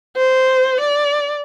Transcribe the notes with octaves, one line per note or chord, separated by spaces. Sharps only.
C5
D5